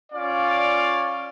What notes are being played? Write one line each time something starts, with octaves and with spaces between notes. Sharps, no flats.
C#4 F4 D5 F5